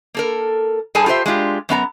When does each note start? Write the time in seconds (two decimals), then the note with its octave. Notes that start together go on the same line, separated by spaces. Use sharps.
0.15 A#3 A4 A#4
0.95 G2 G#4 A4 G#5 A5
1.06 F4 G4 A4 C5 E5
1.26 G#3 D4 F4 G4
1.69 F#2 B3 F4 A#5